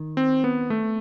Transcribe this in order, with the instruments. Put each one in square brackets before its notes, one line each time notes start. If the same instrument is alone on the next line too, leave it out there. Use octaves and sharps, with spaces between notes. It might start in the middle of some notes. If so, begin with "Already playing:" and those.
Already playing: [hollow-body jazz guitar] D#3
[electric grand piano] C4
B3
A3